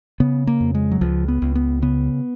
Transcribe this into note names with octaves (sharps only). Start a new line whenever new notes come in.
C#3 B3
A#3
F2
G#3
F#3
C#2 F3
B3
C#2
B3
C#3 B3